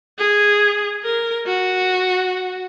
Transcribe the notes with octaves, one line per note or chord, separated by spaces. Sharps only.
G#4
A#4
F#4